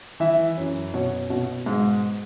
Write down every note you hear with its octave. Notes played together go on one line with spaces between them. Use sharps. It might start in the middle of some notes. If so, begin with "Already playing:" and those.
E3 E5
F#2
B2 C#5
B2
G#2